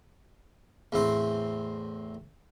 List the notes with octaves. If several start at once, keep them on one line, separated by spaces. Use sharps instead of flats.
E2 A2 C4 C6